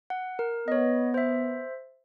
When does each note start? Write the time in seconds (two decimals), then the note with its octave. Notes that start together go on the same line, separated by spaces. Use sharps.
0.10 F#5
0.39 A#4
0.68 B3 C#5 D#5
1.14 C5 E5